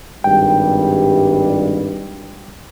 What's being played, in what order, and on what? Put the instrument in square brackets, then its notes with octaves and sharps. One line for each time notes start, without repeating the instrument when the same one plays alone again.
[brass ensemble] G#1 G2 G3 [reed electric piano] G5